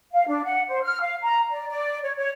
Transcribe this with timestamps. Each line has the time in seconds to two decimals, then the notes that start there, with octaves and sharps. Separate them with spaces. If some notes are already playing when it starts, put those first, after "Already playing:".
0.13 F5
0.27 D4
0.44 F#5
0.68 C5
0.83 F6
1.01 F5
1.23 A#5
1.51 D5
1.68 D5
2.03 C#5
2.16 C#5